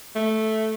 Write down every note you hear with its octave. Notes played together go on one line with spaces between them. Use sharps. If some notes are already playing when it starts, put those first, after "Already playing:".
A3